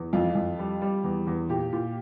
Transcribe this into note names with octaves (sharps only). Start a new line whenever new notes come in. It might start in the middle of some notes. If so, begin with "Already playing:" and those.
Already playing: E2
F2 F4
F2
G3
G3
E2
E2
A#2 G4
A#2